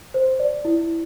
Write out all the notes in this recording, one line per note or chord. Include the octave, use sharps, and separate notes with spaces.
C5
D5
E4